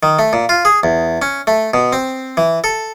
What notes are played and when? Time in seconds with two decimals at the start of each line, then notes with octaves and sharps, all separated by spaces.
0.03 D#3
0.19 A3
0.33 A#2
0.49 F4
0.65 G#4
0.83 E2
1.22 C#4
1.47 A3
1.74 B2
1.93 C4
2.37 E3
2.64 A4